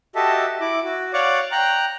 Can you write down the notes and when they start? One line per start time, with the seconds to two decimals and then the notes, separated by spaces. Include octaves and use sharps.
0.15 F#4 G4 A4 D#5 E5 A5
0.61 E4 D6
0.84 F#4
1.13 C#5 D5 F5 F#5 C#6 D6
1.52 G5 A#5 F#6